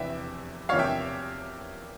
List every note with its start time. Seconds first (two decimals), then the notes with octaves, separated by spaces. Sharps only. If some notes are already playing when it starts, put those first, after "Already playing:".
Already playing: F1 E2 C3 E3 E5 G5
0.69 E2 C3 F3 A#3 C#5 F5
0.79 E5 G5